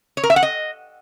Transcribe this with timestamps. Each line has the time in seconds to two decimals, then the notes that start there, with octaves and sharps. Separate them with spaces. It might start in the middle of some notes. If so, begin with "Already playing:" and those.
0.17 C#5
0.23 A#4
0.30 E5
0.36 F#5
0.43 D#5